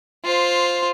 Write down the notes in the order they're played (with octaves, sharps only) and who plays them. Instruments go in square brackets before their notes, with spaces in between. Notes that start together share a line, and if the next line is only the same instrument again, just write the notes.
[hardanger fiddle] F4 C5